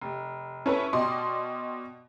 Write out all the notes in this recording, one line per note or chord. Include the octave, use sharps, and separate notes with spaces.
F1
C#4 E4 A4 B4 C#5
B2 D5 D#5 G5 C6